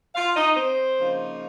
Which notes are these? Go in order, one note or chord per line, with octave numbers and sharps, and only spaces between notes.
F4 F5
D#4 D#5
C4 C5
C#3 F3 A#3 D#4